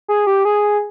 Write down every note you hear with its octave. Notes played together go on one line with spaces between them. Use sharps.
G#4
G4
G#4